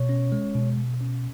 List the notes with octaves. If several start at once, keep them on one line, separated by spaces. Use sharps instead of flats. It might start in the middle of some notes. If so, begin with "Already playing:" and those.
Already playing: B2 C#5
C#4
G#3
B2
B2
C#4